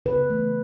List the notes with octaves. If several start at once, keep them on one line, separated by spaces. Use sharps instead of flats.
C#3 B4
E3 A3